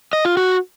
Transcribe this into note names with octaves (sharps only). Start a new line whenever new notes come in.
D#5
F4
F#4